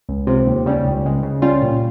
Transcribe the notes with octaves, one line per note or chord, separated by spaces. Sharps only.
C#2
C3 F3
D#2
C#3 G3 C#4
C#2
C#3 G#3
C#3
G3 C#4 F4
A#2